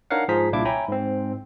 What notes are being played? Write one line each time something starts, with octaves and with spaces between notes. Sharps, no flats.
D4 D#4 A#4 C#5 F5 F#5
G#2 F3 G#4 C5 A#5 B6
C2 A#2 D4 E4 F5 D6
C#5 E5 G5 G#5 A#5 B5
G#2 C4